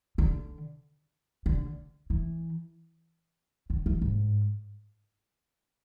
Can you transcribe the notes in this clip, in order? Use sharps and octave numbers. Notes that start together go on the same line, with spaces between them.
D3
D3
E3
D3
E3
G#2